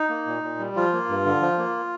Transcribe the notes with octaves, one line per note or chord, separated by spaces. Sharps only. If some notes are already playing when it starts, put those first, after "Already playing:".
Already playing: D#4
A#3
A#2
A#2
G3
F3 F4
A#3
G2
D3
F3
A#3